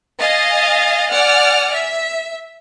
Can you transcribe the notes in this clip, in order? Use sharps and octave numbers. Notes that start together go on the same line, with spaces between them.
D#5 F5 G#5 A6
D5 F#5 G#5 F6
E5